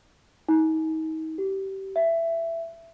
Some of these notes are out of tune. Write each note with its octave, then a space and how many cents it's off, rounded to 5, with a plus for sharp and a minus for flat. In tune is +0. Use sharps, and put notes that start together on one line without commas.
D#4 +35
G4 -25
E5 +15